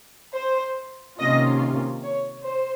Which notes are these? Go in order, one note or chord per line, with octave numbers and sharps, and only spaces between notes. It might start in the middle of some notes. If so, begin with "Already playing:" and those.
C5
C3 D#3 A#3 C#4 F4 D#5
C#5
C5